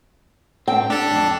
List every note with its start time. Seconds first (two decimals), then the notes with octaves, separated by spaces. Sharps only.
0.68 A2 C4 G5
0.90 D4 G4 A4
1.11 F2 G#2